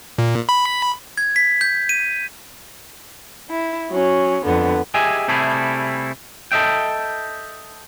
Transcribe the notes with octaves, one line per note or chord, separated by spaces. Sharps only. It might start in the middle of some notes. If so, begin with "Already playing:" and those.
A#2
B5
G#6
B6
G6
D#7
E4
F#3 C#4
F2 D3 B3
G4 G#4 D#5 E5 G#5
C3 G3 A3 E4 G#4
A4 D#5 E5 G5